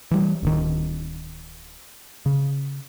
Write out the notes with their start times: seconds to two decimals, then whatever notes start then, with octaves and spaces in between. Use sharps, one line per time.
0.11 E3 G3
0.43 D1 D#3
2.26 C#3